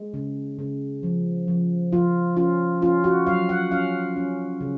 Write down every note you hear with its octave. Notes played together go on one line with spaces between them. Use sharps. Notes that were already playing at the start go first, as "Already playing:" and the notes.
Already playing: G#3
C#3
C#3
F3
F3
F3 F4
C#4 F4
C#4 F4
F#4
F#3 F5
F#5
C#4 F5
C#4
C#3